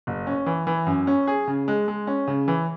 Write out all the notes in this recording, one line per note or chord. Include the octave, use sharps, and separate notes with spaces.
F#1
C#4
E3
E3
F#2
C#4
G#4
C#3
G#3
G#3
C#4
C#3
E3